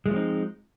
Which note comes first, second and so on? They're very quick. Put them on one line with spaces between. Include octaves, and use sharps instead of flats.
G#3 A3 F3 C4 D#4